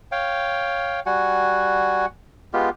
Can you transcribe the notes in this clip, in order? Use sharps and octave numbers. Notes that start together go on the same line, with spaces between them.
C#5 F5 G5
G3 F#4 F#5 G#5
G#3 B3 F4 G4